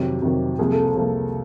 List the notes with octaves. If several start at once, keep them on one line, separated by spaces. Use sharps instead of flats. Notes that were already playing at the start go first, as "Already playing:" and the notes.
Already playing: F2 C3 D#3 F#3 G4
F2 C3 D#3 F#3
C2 C3 F3 A#3 G#4
A4
G#4
C2 C3 F3 A#3